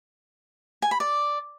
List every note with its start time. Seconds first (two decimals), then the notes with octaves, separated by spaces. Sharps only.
0.82 G#5
0.91 B5
1.00 D5